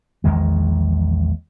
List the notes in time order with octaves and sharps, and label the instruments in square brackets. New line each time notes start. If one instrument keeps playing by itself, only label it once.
[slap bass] A#1 E2 D#3 G#3